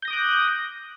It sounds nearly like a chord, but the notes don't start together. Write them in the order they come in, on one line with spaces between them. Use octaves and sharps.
G6 A#6 D#6 D6 F#6